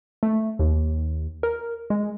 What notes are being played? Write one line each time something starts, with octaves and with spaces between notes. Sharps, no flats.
A3
D#2
A#4
G#3